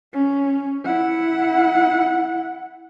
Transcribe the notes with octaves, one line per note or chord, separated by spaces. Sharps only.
C#4
E4 F#5